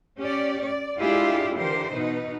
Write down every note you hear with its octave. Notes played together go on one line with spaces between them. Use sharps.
C#4 G4 D5
D5
G#3 D4 E4 F4 G4 G#4
D3 E3 G4 A#4 C5
B2 D#4 B4